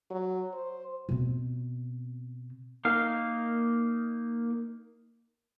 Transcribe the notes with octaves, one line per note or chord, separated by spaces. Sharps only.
F#3
C5
B2 C4
A#3 D#4 F5